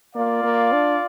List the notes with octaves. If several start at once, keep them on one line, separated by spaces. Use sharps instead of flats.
A#3 F4 D5 F5
A#3
D4